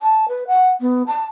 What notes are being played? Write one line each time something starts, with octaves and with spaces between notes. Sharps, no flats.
A5
B4
F#5
B3
A5